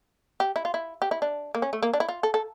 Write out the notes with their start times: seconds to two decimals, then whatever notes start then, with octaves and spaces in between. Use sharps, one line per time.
0.40 G4
0.56 E4
0.65 F4
0.74 E4
1.02 G4
1.11 E4
1.22 D4
1.55 A#3
1.62 C#4
1.73 A3
1.83 A#3
1.93 D4
2.00 E4
2.09 F4
2.23 A4
2.34 A4